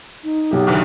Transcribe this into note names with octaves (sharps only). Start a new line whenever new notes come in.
D#4
B1 G4
E2 D3 D#3